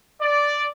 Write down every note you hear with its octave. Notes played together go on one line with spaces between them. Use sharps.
D5